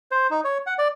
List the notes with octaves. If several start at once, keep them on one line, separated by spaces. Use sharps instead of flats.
C5
D#4
C#5
F#5
D5